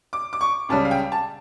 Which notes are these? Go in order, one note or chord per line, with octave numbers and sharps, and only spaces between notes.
D6
D6
C#6
C#2 C#3 G3 A5
F5
G5
A5